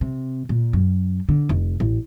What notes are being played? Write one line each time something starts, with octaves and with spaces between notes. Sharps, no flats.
C3
A#2
F#2
D3
F1
A1